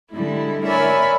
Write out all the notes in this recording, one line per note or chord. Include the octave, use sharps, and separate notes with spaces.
D3 G3 G#3 E4
A#4 C#5 D5 E5 G#5 B5